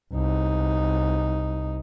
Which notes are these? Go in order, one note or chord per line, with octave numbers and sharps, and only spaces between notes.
C2 D#4